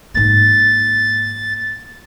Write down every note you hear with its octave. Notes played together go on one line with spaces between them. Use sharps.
G#2 A#3 A6